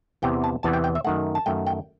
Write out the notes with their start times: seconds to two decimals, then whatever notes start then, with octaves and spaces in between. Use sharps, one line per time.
0.22 E2 C3 E3 B3 G5
0.44 A5
0.63 E2 C3 E3 B3 A5
0.73 G5
0.84 G5
0.95 E5
1.04 F#2 D#3 A3 F#5
1.35 A5
1.46 F#2 D#3 A3 G5
1.67 G5